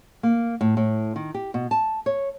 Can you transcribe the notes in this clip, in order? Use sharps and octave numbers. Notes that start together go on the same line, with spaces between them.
A#3
A2
A2
D#3
G4
B2
A5
C#5